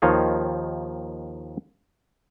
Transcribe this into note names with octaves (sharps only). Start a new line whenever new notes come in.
D#2 D#3 F3 C#5 D#5 F5